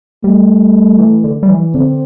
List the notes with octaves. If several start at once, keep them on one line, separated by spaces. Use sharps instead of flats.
G3 A3
E3
D3
G3
E3
D3 C4